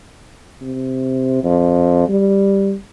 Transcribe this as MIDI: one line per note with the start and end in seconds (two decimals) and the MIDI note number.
0.61 1.42 48
1.43 2.06 41
2.08 2.74 55